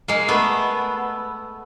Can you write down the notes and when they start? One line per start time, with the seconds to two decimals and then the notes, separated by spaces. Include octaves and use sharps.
0.08 G#3 A#3
0.28 A3 B3